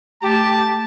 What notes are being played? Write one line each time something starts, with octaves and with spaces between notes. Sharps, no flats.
A3 G4 A5